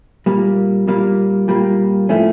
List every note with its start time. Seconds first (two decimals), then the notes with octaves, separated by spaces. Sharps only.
0.26 A#2 G3 A#3
0.88 A#2 G3 A#3
1.48 A#2 G3 A#3
2.09 A2 F3 A3 C#4